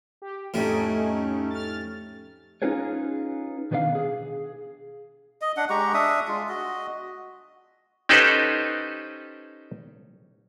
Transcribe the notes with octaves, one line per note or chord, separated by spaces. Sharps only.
G4
F2 A2 G3 A3 C#4 D#4
F6 A6
C#4 D#4 F4 G#4 B4 C#5
B2 D#3 B3 D4 B4 F5
G#4
D#5
D4 F#5
G#3 G4 A#5 C#6
D4 E5 D#6
G#3 F4
F#4 D#5
C#4 D#4 G4 A4 B4 C5